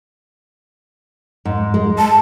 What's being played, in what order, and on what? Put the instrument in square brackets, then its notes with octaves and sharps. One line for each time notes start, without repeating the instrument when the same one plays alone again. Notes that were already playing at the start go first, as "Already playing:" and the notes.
[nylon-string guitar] G#2
G#3
[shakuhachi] A5